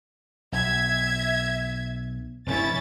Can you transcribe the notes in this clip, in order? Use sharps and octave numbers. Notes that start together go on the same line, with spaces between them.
B1 E5 G#6
F1 G2 C#4 E4 A6